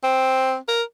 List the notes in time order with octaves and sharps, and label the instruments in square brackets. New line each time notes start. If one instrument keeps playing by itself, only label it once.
[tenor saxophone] C4
A#4